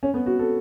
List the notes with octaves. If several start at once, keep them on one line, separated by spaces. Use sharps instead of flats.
C#4
B3
F#4
A4